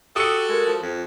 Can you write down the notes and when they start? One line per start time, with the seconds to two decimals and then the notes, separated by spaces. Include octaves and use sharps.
0.16 F#4 G4 A4 D#6 E6 C#7
0.49 G#3 A#4
0.66 F3
0.83 F2 F4